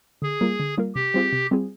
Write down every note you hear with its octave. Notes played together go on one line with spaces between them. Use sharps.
D3 G#4
G3 A#3 F4 A#4
D3
G3 A#3 F4 A#4
C3 G4
G3 C4 F4 G#4
C3
G3 C4 F4 G#4